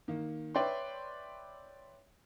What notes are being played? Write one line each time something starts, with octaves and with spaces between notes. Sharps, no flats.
D#3 A#3
B4 C#5 D5 E5 G5 C6